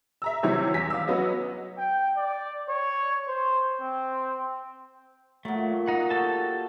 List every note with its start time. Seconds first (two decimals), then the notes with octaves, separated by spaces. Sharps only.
0.22 E5 A#5 E6
0.43 C3 D#3 E3 F#3 G3 C#5
0.74 E2 G#5 A#6 B6
0.90 F5 D6 E6
1.08 F#3 B3 C#4 F#4 D#5
1.78 G5
2.17 D5
2.69 C#5
3.28 C5
3.81 C4
5.45 A#2 F#3 A3
5.88 D#4 F#5
6.11 F#4 G4 A4 A5